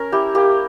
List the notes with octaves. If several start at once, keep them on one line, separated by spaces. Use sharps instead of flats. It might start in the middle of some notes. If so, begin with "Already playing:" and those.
Already playing: C#4 A#4
E4 G4
A#3 G4